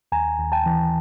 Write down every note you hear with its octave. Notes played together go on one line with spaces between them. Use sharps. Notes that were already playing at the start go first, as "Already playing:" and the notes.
D#2 G#5 A#5
D#2
G5 A5
E3